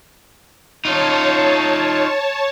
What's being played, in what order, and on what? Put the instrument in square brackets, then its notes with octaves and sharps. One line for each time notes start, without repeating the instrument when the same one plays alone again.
[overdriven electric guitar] D#4 F4 [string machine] C#5 A5